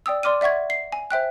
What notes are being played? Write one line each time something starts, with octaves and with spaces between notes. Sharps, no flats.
D5 G5 D#6 E6
D5 C6 D6 F6 D#7
D5 E5 F#5 C#6 G#6
C7
G#5
C5 E5 G5 F#6